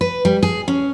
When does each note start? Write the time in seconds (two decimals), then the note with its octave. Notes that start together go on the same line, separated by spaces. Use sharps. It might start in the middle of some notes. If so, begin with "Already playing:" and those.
0.01 B4
0.25 G3
0.43 G#4
0.68 C#4